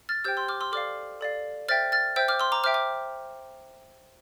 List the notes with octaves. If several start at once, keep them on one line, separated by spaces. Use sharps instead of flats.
F6 A6
G4 C5 G5 E6 G6
C6 E6
D6 F6
C6 E6
A4 D5 F5 D6 F6
A4 D5 F5
C5 E5 G5 F6 A6
F6 A6
C5 E5 G5 E6 G6
D6 F6
C6 E6
A#5 D6
C5 E5 G5 D6 F6
D6